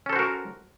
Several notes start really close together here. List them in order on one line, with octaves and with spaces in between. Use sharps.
C#4 A4 C5 F#4 A#4